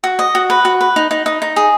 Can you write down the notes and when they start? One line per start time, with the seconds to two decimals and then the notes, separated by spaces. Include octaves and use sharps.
0.04 F#4
0.19 D#5
0.35 F#4
0.50 B4
0.65 F#4
0.81 B4
0.96 D#4
1.11 D#4
1.26 D#4
1.42 D#4
1.56 G#4